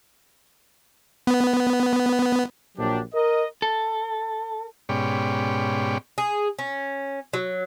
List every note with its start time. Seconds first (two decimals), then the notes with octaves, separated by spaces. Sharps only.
1.27 B3
2.78 A#1 F#3 D4 G4
3.14 A#4 D#5
3.62 A4
4.89 G#2 B2 C#4 G4 D5
6.18 G#4
6.59 C#4
7.33 F#3